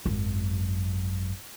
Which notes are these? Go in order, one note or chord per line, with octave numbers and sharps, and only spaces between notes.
G#1 F#2